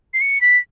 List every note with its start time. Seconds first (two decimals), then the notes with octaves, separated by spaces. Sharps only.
0.14 C7
0.21 C#7
0.41 B6